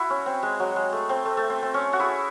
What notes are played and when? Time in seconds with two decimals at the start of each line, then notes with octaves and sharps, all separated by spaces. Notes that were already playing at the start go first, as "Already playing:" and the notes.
Already playing: E4 F#4
0.10 C#4
0.26 C4
0.43 G#3
0.60 F#3
0.76 G#3
0.92 A3
1.09 C4
1.25 A3
1.37 A3
1.50 C4
1.63 C4
1.74 C#4
1.93 F#4
1.99 E4 G#4